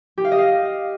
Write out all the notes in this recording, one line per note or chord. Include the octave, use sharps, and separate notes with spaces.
G4
F5
D#5
F5